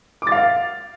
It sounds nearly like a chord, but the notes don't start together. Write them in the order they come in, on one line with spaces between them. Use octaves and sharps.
D6 A6 F5